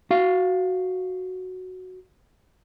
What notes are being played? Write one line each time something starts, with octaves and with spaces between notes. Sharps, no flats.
F#4 F5